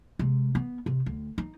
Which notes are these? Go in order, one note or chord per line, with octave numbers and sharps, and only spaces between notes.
C3 G#3
B3
C3
D2
D#4